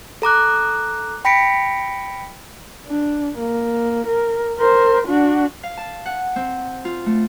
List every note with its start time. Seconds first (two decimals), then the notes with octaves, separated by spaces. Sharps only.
0.22 A4 A#5 D6 F#6
1.25 G5 B5 A#6 B6 C#7 D7
2.87 D4
3.38 A#3
4.07 A#4
4.58 A#4 C5
5.08 D4 F#4
5.63 F5
5.77 A5
6.06 F#5
6.36 C4
6.85 F4
7.06 A3